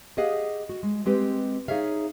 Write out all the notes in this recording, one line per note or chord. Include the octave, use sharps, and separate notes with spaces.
G4 G#4 D#5 F5 F#5
F#4
G#3
G#3 C4 G4 B4
D#4 G#4 C#5 E5 F5